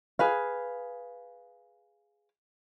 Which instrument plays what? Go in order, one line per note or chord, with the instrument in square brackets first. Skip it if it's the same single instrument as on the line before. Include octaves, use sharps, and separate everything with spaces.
[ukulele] G#4 B4 F5